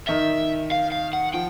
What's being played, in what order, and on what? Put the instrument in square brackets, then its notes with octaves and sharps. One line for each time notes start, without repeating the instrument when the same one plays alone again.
[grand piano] D#3 [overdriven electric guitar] E5
[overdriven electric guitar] F5
F5
F#5
[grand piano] F3 [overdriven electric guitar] G5